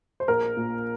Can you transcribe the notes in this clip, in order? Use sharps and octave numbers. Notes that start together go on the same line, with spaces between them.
C5
A#1 A#4
A#2